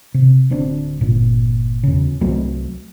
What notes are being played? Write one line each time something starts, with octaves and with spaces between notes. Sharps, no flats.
C3
D1 D2 C4 D4
G1 A#2
E2 C#3
C2 F#3 A3 C4